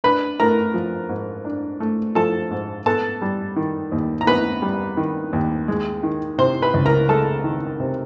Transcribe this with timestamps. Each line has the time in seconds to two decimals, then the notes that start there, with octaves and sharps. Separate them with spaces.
0.04 D4 B4 B5
0.40 A3 A#4 A#5
0.74 F3
1.09 G#2
1.45 D4
1.80 A3
2.15 F3 A4 A5
2.51 G#2
2.86 B3 A4 A5
3.22 G3
3.56 D#3
3.92 D#2
4.21 A#5
4.27 B3 B4 B5
4.62 G3
4.97 D#3
5.33 D#2
5.68 G#3
6.03 D#3
6.38 C3 C5 C6
6.62 B4 B5
6.74 C#2
6.86 A#4 A#5
7.09 G#3 A4 A5
7.44 D#3
7.80 C3